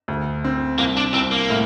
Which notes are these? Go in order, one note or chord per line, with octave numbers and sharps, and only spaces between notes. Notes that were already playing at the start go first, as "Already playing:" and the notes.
D2
C4
C2 A#3
D4
C2 C4
A#3
A2